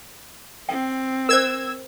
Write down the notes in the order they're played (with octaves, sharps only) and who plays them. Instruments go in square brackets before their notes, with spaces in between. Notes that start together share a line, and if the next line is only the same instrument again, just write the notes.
[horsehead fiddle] C4 [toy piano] G5
[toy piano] A#4 C5 [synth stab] E6 G#6